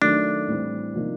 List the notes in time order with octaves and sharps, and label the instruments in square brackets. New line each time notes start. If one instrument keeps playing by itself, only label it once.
[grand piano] D#3 F#3 A3 [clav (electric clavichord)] D4
[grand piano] A2 E3 G3 C4
C3 F3 A#3 D#4